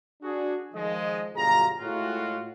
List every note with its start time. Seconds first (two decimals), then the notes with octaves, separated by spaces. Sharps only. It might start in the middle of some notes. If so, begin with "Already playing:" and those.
0.22 D4 F#4 G#4
0.74 D#3 F3 G#3 D#5
1.36 G1 F#2 B2 F4 G#4 A#5
1.80 A2 G#3 F4 F#4